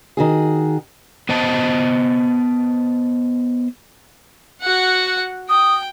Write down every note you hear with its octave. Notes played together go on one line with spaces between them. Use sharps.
D#3 F#4 G#4
B3 C5 D#5 A5
F#4 F#5
G5 D#6